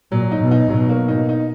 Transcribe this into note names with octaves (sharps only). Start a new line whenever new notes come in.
A#2 F#3
D#4
B2
D#4
B2 F#3
A#3
D#4
D#4